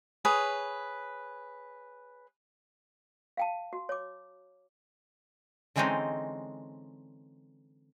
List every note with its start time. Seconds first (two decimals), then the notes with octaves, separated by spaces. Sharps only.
0.25 G#4 B4 C#5
3.37 F5 G5 A5
3.73 F#4
3.89 C#5 D6
5.76 D3 E3 G#3 C4 C#4 D#4